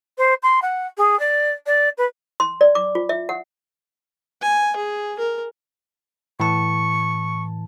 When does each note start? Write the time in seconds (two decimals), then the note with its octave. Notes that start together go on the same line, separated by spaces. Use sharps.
0.18 C5
0.43 C6
0.62 F#5
0.97 G#4
1.19 D5
1.66 D5
1.98 B4
2.40 C6
2.61 D5
2.75 D6
2.95 F4
3.09 E5
3.29 F#5
4.42 G#5
4.76 G#4
5.19 A#4
6.40 A2 E3 A5 C#6